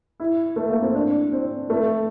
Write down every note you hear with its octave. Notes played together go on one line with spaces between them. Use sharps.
E4
A3
A#3
C4
D4
C4
A3